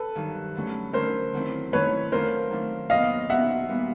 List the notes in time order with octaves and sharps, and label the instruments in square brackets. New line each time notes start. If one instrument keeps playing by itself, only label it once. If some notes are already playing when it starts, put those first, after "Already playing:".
Already playing: [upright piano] A4 B4
[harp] G2 D#3 F#3
D3 F#3 A3 C#4
[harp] D3 F#3 A3 C#4 [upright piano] A#4 C5
[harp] D#3 F#3 A3 C4 E4
[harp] D#3 F#3 A3 C4 E4 [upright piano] B4 C#5
[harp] D#3 F#3 A3 D4 F4 [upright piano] A#4 C5
[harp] D#3 F#3 A3 D4 F4
[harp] A#2 F#3 B3 D#4 [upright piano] D#5 F5
[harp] A#2 F#3 B3 D#4 [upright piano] E5 F#5
[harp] A#2 G3 B3